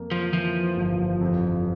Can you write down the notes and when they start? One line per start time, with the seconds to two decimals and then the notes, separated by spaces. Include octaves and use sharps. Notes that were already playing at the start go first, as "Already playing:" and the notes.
Already playing: F2 A#3
0.11 F3
0.32 E3 F3
0.77 G1
1.21 F2